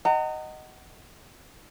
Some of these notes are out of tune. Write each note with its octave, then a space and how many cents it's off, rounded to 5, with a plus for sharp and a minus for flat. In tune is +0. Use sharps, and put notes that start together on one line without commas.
D#5 -5 F#5 +25 A#5 -35